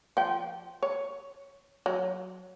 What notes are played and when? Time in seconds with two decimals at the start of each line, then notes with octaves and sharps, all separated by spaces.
0.17 F3 G5
0.83 C#5
1.86 F#3